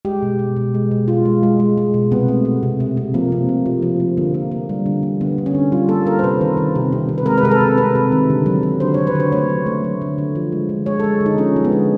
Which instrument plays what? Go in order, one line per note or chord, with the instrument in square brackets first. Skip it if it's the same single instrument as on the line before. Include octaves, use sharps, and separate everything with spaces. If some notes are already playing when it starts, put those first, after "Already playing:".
[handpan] G#3 G4
B2
B2
B2
G#3
B2
G#3 F4
G#3
G#3
G#3
G#3
B2
C3 B3
A3
A3
C3
C3
C3
F3 A#3
C3
A3
F3
F3
F3
D3 A#3
A#3
A#3
G3
D3
A#3
D3 B3
D3
C#4
D3
G3 F4
A#3 A4
A#3 A#4
C5
C3 B4
D#3
D#3
C3
C3
C3
B4
G#3 A#4
B4
C3 A#4
A4
C3
C3 B4
C3
D#3
D3
F#3
F#3
D3 C5
F#3 C#5
B4
D3 C5
A3 C#5
F#3
A3
F#3
D3
D3
F3
G#3
D3
G#3 C#5
A4
G#3
D3
D#4
F3 C#4
G#3
B3
D3